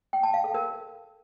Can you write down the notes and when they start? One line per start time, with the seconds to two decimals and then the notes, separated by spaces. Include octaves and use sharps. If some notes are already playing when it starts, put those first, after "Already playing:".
0.13 G5
0.23 A5
0.34 F5
0.44 A4
0.54 A#4